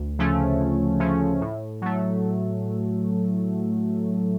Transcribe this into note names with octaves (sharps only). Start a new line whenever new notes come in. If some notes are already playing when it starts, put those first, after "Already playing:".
Already playing: D2
C#3 F3 A3 C#4
D2
C#3 F3 A3 C#4
A2
F#3 A3